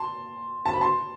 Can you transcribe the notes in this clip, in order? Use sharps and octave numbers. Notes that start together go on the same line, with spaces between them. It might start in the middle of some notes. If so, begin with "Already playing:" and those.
Already playing: A5 C6
A5
B5
A5 C6